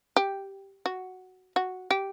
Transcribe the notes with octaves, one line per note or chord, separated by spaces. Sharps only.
G4
F#4
F#4
G4